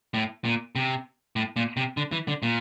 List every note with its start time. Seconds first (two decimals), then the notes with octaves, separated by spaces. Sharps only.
0.14 A2
0.45 A#2
0.76 C3
1.36 A2
1.56 A#2
1.77 C3
1.97 D3
2.12 E3
2.28 D3
2.43 A#2